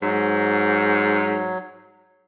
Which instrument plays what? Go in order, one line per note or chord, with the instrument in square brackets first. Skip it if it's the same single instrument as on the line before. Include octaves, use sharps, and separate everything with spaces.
[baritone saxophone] G#2 [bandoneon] F#3